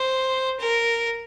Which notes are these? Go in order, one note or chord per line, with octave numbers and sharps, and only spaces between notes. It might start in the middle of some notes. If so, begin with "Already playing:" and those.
Already playing: C5
A#4